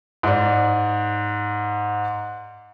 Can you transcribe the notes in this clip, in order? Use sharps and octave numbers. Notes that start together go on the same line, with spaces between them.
G#2 D5